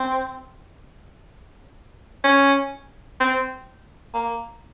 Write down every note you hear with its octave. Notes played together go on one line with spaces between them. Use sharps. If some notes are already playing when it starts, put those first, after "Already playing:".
Already playing: C4
C#4
C4
A#3